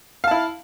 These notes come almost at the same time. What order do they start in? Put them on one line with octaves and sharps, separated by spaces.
F5 A5 E4